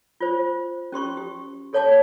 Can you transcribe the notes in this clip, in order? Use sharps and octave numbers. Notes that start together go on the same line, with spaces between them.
F4 C5
C#4 G4 C6 C#6
G4
G#4 A4 C#5 F#5 A5 D6